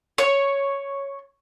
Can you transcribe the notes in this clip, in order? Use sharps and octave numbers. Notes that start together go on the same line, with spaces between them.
C#5